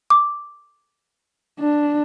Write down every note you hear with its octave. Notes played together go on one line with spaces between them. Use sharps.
D6
D4